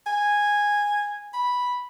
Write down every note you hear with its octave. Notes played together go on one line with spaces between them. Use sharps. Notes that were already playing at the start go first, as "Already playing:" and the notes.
G#5
B5